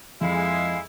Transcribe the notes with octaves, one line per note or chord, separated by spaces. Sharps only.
F2 G#3 E4 F5